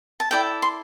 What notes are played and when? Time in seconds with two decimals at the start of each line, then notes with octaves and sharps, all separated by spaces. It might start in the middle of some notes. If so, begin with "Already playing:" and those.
0.20 A5
0.31 E4 A4 D5 G5
0.62 C6